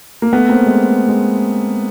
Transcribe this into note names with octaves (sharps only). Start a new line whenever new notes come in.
A#3
A3 B3
A#3 C4
G#3
G#3